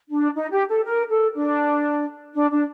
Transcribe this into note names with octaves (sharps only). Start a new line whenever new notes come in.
D4
D#4
G4
A4
A#4
A4
D4
D4
D4